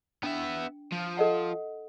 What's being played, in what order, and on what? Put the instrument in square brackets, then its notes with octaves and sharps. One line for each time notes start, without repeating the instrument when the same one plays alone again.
[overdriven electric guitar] B3 E5 [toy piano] D4 G5
[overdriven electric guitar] F3
[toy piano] A4 D#5 F#5